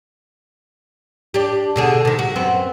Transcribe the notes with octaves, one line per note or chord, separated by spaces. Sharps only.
D4 G4
B2 D3 G#4
C3 D#3
F#4
F#2 B3 C4